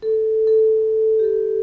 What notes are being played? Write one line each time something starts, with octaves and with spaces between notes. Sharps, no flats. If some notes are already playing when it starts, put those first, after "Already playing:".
A4
A4
G4
A4